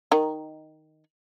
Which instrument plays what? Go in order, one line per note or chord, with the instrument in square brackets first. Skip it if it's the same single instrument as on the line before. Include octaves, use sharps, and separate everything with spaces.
[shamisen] D#3 D#4